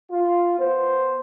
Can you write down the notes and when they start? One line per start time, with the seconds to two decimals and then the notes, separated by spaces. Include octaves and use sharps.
0.12 F4
0.59 B3 C5